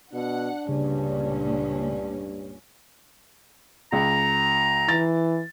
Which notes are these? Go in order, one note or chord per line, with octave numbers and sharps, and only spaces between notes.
B2 D4 F#5
C#2 G2 A#2 C#3 C#4
C#2 A#5
E3 A6